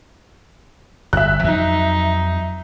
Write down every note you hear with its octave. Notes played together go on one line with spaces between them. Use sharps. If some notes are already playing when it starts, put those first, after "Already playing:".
G1 E5 F#6
F2 F3 F#3 D#4